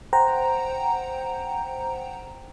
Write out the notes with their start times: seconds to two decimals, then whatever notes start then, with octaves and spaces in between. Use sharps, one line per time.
0.13 C5 F#5 G5 A#5